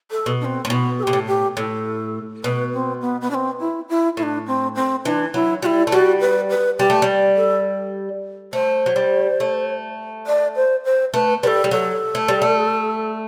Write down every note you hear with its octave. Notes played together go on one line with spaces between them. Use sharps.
A4
B2
D4
C4
A2
B2 B3
A4
B2 G4
A2
G4
A2 A4
B2 B4
C4
B3
B3
D4
C4
E4
E4
A2 E4
D4
C4
C4
E3 D4
F#3 E4
G3 E4 F#4
A3
G3 F#4
B4
B4
G3 G4
A3
G3
A4
A3 C5
F#3
G3
A3
D5
C5
C5
A3 B4
G3 A4 B4
G3
F#3 A4
A3
G3
A3